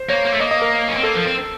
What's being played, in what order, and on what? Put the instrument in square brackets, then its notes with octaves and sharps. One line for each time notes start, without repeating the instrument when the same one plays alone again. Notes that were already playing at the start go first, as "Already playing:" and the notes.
Already playing: [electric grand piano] C5
[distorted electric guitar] A#3 [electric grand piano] C#5
[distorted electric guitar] A#3
A3
[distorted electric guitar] A#3 [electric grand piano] D#5
[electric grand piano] D#5
A#4
[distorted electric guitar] C#4
C4
[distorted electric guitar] A#3 [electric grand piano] A4
[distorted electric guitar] F3
C4